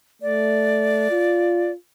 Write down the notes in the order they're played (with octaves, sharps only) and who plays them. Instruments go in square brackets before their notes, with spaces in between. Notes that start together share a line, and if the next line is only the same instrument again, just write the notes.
[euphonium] A3 [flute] D5
[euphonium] F4